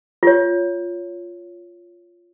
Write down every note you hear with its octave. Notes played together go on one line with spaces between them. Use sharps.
F4 C#5